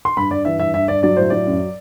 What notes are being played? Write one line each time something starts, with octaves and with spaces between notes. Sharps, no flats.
C6
G2 B5
G2 D5
E3 E5
G2 E5
G2 E5
G2 D5
F#3 D5
A2 C5
F#3 D5
F#2